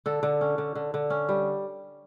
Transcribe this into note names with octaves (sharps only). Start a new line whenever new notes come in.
D3 A4
D3
C#4
D3
D3
D3
C#4
G3